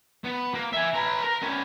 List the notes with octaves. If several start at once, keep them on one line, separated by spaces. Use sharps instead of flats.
B3
A#3
E5 G#5
B4 A#5
A#4
B3 C#4